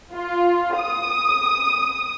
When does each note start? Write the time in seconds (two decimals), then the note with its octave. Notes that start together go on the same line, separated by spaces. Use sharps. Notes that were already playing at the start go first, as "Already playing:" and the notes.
0.13 F4
0.76 D#6